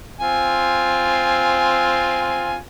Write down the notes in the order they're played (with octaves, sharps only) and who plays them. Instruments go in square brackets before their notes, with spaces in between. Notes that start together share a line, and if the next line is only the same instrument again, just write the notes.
[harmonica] C4 F4 G#5